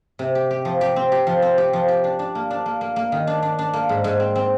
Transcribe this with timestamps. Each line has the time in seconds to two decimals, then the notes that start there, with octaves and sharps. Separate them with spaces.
0.19 C3
0.35 G4
0.51 G4
0.65 F3
0.81 G4
0.96 C4
1.12 G4
1.27 F3
1.42 C4
1.58 G4
1.73 F3
1.88 G4
2.04 D4
2.19 D4
2.35 A#3
2.51 D4
2.66 A#3
2.81 A#3
2.96 A#3
3.12 D#3
3.27 D4
3.42 D4
3.59 D4
3.73 A#3
3.89 G#2
4.04 G#2
4.20 C4
4.35 C4